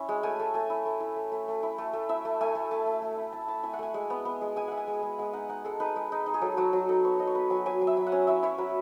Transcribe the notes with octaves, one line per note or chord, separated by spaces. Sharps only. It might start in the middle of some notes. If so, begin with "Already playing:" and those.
Already playing: C#4 E4
G#3
A3 G#5
A3
A3 G#5
E4
A3
E4
A3
A3
A3
E4
A3
A3
E4 E5
A3
A3 G#5
A3
A3 A5
A3
A3
E4
E4 A5
E4 A5
E4 G#5
F#5
A3 G#5
G#3
B3
B3
G#3
G#3 G#5
E4 F#5
G#5
G#3
G#3
G#3 F#5
D#4 F#5
D#4 F#5
G#3 A4
D#4 B4
G#3
D#4
D#4
G#4
F#3 A4
F#3 F#4
F#3 F#4
D#4 A4
B3 C#5
F#3 D#5
C#5
B3 B4
F#3 G#5
F#3 G#5
F#3
E5
F#3
F#5
C#4
E4 E5
E4 C#5
F#3 B4